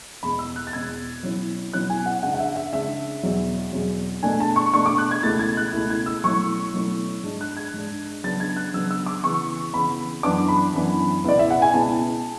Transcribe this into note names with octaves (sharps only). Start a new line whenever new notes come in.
E2 B2 G#3 B5
E6
F#6
A6
E2 B2 G#3 G#6
B2 F#3 C#4 E4
B2 F#3 C#4 E4 F#6
G#5
F#5
C#3 G#3 D4 F#5
F#5
E5
E5
C#3 G#3 D4 E5
E2 B2 F#3
E2 B2 F#3
B2 A3 D4 G#5
A5
C#6
B2 A3 D4 C#6
D6
F#6
G#6
C#2 B2 A3 E4 A6
G#6
F#6
C#2 B2 A3 E4
G#6
E6
B2 F#3 A3 C#4 E4 C#6
B2 F#3 A3 C#4 E4
G#2 G#3 D4
F#6
G#6
G#2 G#3 D4
C#3 F#3 B3 D4 A6
G#6
F#6
C#3 F#3 B3 D4 E6
E6
D6
C#3 E3 B3 C#6
C#3 E3 B3 B5
F#2 E3 B3 D4 D6
B5
F#2 E3 B3 D4
C#2 B2 G#3 B3 E4 D5
E5
F#5
G#5
C#2 B2 G#3 B3 E4 A5